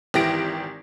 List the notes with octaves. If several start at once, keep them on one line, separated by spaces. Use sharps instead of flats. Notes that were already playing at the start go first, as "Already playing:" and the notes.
G#1 E3 G4 A#6 D7